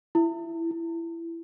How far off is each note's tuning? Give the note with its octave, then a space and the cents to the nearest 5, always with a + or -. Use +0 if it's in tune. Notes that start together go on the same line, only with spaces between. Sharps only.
E4 +15
E4 +20